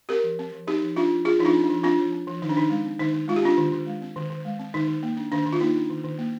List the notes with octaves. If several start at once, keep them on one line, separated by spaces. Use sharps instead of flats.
C4 G4 A#4
F3
C4
F3
C4 D#4 G4
F3
C4 D4 F4
F3
C4 F4 G#4
F3 D#4
D4 F4
C4
D4
F3
C4 D4 F4
F3
C4
F3
D#3 D#4
D4
D#3 D#4
G#3
C4
D#3 D#4
D#3
G#3 F4
G4
C4 D4 F4
D#3
D#3
G#3
C4
D#3
D#3
G#3
C4
D#3 D#4
D#3
A#3
D4
D#3 D4
D#3
F4
A#3 D#4
D4
D#3
D#3
A#3